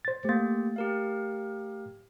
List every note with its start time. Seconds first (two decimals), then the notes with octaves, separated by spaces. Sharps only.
0.05 C5 A6
0.25 A3 A#3 G4 A6
0.76 G4 A#4 F5